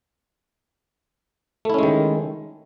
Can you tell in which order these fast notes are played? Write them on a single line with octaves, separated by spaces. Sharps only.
A3 E4 C#4 G#3 D#3